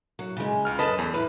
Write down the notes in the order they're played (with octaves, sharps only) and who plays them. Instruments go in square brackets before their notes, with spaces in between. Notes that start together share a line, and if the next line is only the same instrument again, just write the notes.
[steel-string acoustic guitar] F#3
C#3 G#3
[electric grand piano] C#2 F6
[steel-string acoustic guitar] F#2 A4 [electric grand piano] B4 D#5 A5
[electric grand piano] E2
[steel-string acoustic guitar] A2 [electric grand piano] B4